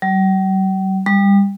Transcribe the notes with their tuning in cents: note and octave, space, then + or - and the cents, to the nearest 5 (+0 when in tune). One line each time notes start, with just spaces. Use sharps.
G3 -45
G3 +25